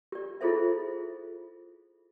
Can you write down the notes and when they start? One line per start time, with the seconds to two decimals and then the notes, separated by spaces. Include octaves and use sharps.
0.12 G4 D5
0.41 E4 F4 G#4 A4 C5 E5